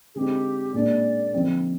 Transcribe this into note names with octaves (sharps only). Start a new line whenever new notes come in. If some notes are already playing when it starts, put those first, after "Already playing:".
D3 G#3 C4 D#4 G4 G#4
A#2 G#3 D4 D5
D3 F3 C4 D#4